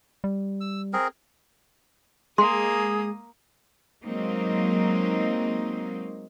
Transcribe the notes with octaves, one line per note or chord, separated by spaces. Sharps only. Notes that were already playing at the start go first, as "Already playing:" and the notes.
G3
E6
C4 G#4 A#4
G#3 A#3 G#4 C6 D#6
F#3 G#3 A#3 C4 D#4